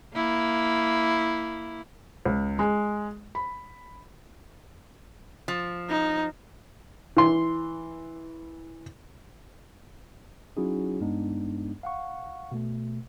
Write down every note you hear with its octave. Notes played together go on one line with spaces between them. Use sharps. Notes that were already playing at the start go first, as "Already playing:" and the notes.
A#3 E4
C#2
G#3
B5
F3
D#4
E3 C6
F#3 C#4 D#4 E4 F#4 G#4
G2 G#3 B3 D4 D#4
F5 F#5 C#6
B2 A3